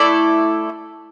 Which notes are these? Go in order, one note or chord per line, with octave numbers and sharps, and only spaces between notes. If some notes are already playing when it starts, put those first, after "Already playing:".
Already playing: A3 E4 A4 D5